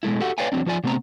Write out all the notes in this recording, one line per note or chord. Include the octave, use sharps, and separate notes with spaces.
B2 G#3 A3 E4
F#4 G4 A4 F#5
B4 C#5 D5 F5 G5 G#5
E2 G2 F#3 C4 D4
F3 F4 D5 G#5
C3 A3 B3 C4 A#5